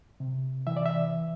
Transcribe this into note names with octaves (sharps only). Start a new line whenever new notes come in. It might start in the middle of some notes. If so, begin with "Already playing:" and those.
C3
E3 E5
D5
E5